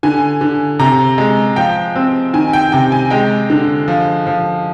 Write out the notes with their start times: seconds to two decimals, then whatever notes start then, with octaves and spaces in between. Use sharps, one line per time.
0.03 D3 G#5
0.41 D3
0.79 C3 A#5
1.18 G#3
1.56 F3 G5
1.96 C4
2.33 D#3 G#5
2.53 G5
2.72 C3 G5
2.92 G#5
3.11 G#3 G5
3.50 D3
3.88 F3
4.27 F3